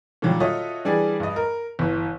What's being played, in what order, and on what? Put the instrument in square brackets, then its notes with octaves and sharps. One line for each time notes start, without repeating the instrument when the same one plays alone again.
[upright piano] A#2 D3 D#3 F#3 G3
F4 F#4 A4 C#5 D#5 E5
E3 G3 D4 G#4
G2 D#5
A#4
G1 E3